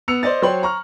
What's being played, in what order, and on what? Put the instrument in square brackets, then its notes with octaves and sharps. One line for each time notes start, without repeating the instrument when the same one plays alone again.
[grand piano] B3 E6 C#7 F7
C5 D5 D#5 A6
F#3 C5 C#5 G5 C6 F#7
A#5 C#6 F6